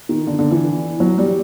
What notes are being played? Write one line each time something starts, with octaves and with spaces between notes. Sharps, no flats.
D#3
D3
D3
E3
F#3
G3